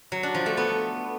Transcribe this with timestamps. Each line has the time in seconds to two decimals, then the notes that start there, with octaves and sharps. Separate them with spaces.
0.12 F#3
0.23 D4
0.35 F3
0.46 A3
0.57 B3